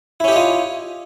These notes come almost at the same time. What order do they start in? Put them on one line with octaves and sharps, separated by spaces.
E4 C#4 G4 D#5 F4